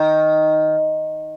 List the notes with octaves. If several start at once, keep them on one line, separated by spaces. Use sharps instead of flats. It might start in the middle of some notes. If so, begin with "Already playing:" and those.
Already playing: D#3